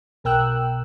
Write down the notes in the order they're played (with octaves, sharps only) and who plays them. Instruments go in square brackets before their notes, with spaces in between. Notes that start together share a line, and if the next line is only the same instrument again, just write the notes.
[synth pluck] B1 B2 A#4 G5 E6 F#6